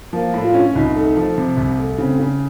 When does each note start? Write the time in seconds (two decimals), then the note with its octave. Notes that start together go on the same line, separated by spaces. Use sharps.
0.13 F3 A#3
0.34 A2
0.44 F4
0.54 C#4
0.76 C2 D#4
0.96 A3
1.17 F3
1.38 C3
1.57 C2
1.79 A3
1.98 C#3 C4
2.19 C#3